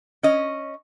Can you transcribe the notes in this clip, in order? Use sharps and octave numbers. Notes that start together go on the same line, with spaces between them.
C#4 D#5